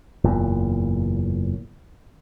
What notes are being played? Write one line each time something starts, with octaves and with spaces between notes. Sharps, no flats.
F#1 E2 A#2